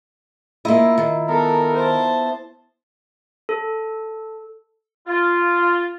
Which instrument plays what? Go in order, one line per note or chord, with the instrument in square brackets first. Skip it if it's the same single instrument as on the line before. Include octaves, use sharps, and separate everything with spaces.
[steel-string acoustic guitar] A#3 D#5 [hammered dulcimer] E4 F4
[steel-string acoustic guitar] D#3
[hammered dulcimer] B3 [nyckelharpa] A4 [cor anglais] A#4
[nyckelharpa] C5 A5
[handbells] A4
[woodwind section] F4